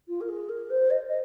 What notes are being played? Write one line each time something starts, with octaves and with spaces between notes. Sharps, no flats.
F4
A#4
G#4
A#4
C5
D#5
D#5